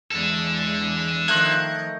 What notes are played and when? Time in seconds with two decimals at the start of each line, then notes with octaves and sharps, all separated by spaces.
0.11 E2 G#3 D4 A4
1.28 D#3 F3 A3 C5 D#5 F#6 G#6